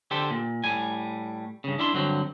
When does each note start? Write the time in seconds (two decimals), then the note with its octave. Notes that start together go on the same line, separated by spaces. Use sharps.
0.11 D3 G4 A4 C5
0.31 A#2
0.64 A2 G3 G#5
1.64 G2 C#3
1.79 D4 E4 E5 C6
1.93 G2 D3 F#3 C4